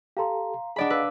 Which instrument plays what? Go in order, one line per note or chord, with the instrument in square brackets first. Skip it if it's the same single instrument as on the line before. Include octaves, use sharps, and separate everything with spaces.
[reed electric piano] G4 A4 [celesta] F5 A#5 C6
[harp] D4 D5 B5 [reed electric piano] G#4 D#5 F#5
[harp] B4 [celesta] F5 E6